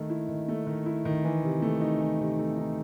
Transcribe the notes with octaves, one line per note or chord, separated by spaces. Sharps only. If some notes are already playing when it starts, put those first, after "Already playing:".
Already playing: D#3 A3
E4
D#3
A3
D#3
E4
D#3
E3
C3
A3
D#4
E3
C3
A3
D#4